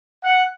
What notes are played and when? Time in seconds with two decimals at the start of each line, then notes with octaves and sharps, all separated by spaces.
0.23 F#5